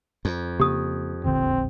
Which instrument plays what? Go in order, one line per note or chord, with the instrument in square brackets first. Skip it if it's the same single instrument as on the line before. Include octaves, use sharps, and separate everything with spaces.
[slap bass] F2
[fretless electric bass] C#3 A#3 C#4 [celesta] G4 D#6
[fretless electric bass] E1 A#1 D3 [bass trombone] C4